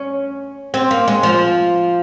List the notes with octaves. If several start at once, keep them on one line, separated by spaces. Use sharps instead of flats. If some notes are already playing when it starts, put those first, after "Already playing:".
Already playing: C#4
C4
A#3
G#3
F3